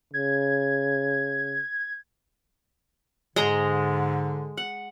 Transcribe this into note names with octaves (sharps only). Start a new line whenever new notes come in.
C#3 G#6
G#2 D3 G#3 A#5 C6
F#5